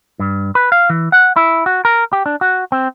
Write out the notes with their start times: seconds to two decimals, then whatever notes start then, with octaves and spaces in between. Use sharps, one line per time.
0.19 G2
0.55 B4
0.72 F5
0.90 E3
1.12 F#5
1.36 E4
1.66 F#4
1.85 A#4
2.13 G4
2.26 D4
2.41 F#4
2.72 C4